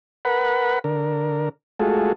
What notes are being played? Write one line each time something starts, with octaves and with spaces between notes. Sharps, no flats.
A#4 B4 F#5 B5
D3 A#4
G#3 A3 F4 F#4 G#4 A4